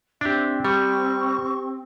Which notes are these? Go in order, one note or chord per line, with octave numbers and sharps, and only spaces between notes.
C4 D4 G4 E5
G3 G4 C#6